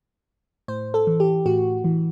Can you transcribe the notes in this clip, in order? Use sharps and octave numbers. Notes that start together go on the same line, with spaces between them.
A2 C5
A4
E3
G4
A2 F#4
E3